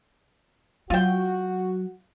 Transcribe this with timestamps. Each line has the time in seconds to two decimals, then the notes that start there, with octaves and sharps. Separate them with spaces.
0.90 F#3 F4 F#4 G5